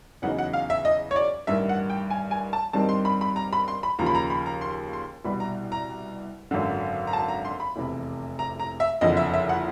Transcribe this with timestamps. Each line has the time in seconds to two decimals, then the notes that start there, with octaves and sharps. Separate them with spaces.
0.22 E2 C#3 F#3 B3 D#4 F#5
0.39 F#5
0.53 F5
0.70 E5
0.85 D#5
1.11 C#5
1.16 D5
1.47 A1 G2 D#3 E5
1.69 F#5
1.90 G5
2.10 G#5
2.31 G#5
2.53 A5
2.73 G2 D#3 G3 C4 D#4 A5
2.89 C6
3.05 B5
3.21 B5
3.36 A#5
3.53 B5
3.68 C6
3.83 B5
3.99 D#2 C#3 F3 A#5
4.06 B5
4.15 A#5
4.30 B5
4.46 A#5
4.61 C6
4.93 C6
5.25 C2 B2 G3 B3 B5
5.40 A#5
5.72 A#5
6.51 G#1 F#2 D3
7.07 A#5
7.13 A5
7.28 A#5
7.45 C6
7.60 B5
7.76 F1 E2 C3
8.39 A#5
8.60 A#5
8.80 E5
9.01 F#1 F2 D3 D#5
9.17 E5
9.33 E5
9.49 F#5